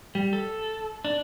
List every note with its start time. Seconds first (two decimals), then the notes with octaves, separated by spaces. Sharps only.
0.15 G3
0.33 A4
1.05 D4